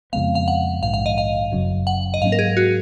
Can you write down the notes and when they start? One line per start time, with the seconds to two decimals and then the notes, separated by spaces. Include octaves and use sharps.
0.13 F2 C#3 G#3 B3 F5
0.35 F5
0.48 F#5
0.83 A#1 G#2 D#3 F5
0.94 F5
1.06 D#5
1.18 F5
1.52 F#1 F#2 C#3 F#3
1.87 F#5
2.14 D#5
2.22 G#2 F#3 A#3 C#4 F5
2.32 A#4
2.39 G#4
2.57 F#4